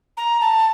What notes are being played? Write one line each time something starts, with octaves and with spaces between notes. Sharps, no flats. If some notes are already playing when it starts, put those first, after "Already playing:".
A#5
A5